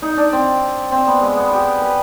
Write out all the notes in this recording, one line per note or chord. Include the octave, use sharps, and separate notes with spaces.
D#4
D4
C4
C4
B3
G#3
B3
G4
B4